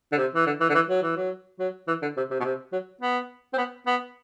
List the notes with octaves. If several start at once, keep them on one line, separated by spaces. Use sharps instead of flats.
D3
C3
E3
D3
E3
D3
E3
F#3
E3
F#3
F#3
E3
D3
C3
C3
B2
C3
F#3
B3
C4
B3
B3